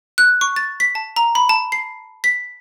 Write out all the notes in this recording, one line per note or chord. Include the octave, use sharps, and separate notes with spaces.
F#6
C#6
A6
B6
A5
A#5
B5
A5
C7
B6